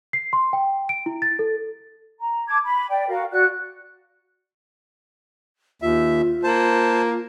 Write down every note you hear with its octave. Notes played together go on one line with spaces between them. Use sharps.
C7
C6
G5
D7
E4
A6
A4
A#5
A5 D6 G#6
B5
D5 G5
F#4 A#4 F5
F#4 D5 F#6
D#2 F4 E5
A#3 C5 A5